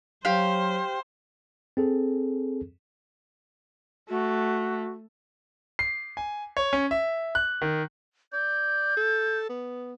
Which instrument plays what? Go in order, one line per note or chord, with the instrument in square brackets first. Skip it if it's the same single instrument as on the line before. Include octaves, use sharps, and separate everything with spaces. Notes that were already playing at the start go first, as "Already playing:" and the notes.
[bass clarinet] F#3 [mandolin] G4 F5 [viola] C5
[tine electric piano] C4 G#4 A4
[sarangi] A3 [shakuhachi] F#4
[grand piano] C7
G#5
C#5
C#4
E5
F#6
D#3
[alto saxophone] D5 [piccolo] G6
[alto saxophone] A4
B3